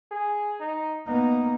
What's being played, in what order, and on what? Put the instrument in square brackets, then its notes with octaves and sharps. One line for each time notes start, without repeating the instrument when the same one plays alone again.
[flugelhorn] G#4
D#4
[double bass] A#3 B3 [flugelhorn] D#4